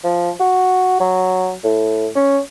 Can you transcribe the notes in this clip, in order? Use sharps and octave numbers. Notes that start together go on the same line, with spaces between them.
F3
F#4
F#3
A2
C#4